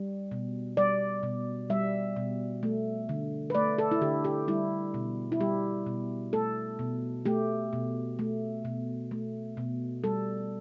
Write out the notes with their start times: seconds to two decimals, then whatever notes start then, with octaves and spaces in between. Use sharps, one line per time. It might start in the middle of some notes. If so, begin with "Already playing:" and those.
Already playing: G3
0.31 B2
0.77 G3 D5
1.23 B2
1.70 G3 E5
2.16 B2
2.63 A3
3.09 D3
3.50 B4
3.55 A3 D5
3.78 A4
3.91 E4
4.02 D3 G4
4.25 G4
4.48 G3 E4
4.94 B2
5.32 E4
5.40 G3 G4
5.87 B2
6.33 A3 A4
6.79 B2
7.26 A3 G4
7.73 B2
8.19 A3
8.65 B2
9.11 A3
9.57 B2
10.04 G3 A4